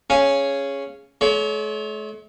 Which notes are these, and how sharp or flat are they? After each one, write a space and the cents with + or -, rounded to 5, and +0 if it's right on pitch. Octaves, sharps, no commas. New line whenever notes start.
C#4 +0 G#4 +0 F5 -15
A3 -45 C#5 +30